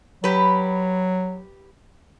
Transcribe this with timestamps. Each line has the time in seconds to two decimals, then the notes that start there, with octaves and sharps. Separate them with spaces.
0.24 F#3 G4 B4